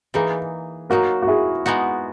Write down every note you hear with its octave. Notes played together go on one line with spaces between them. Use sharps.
E3 A#3 D#4 G#4 B4
F#3 A#3 D#4 F#4 A#4
F#4
E4 G#4
G#3 B3 D#4 F#4